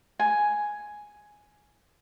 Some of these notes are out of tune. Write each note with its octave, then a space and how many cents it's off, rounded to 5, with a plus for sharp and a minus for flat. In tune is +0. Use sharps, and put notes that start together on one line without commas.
G#5 +5